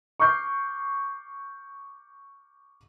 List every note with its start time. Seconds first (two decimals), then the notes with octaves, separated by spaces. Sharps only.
0.20 C#6 D6 F6 G6 C7